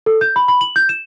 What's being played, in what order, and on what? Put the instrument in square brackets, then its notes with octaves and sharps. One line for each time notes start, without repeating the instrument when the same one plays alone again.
[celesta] A4
G6
B5
B5
F#7
G6
E7